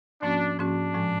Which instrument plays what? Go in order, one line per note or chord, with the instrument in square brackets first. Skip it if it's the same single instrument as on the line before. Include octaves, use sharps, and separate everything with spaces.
[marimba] G#2 F3 A#3 C#4 F#4 [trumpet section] D4
[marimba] G#2 F3 A#3 C#4 F#4 [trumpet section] D4
[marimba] A2 F3 G#3